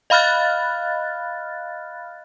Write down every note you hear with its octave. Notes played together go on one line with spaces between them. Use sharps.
D#5 F5 B5 F6 F#6 A6